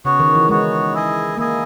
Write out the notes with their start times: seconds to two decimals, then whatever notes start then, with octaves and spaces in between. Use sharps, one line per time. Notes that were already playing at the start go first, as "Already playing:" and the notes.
0.05 C#3 B3 F#4 C#5
0.20 D#3
0.35 E3
0.49 G#3 B3 F#4 C#5
0.93 E4 G#4 D#5 G#5
1.38 A#3 E4 G#4 D#5 G#5